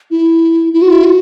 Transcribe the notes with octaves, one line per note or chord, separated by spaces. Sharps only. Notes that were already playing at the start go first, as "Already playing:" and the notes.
E4
E4
F#4
E4
F#4